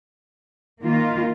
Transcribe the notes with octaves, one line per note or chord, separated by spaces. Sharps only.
D#3 A#3 F4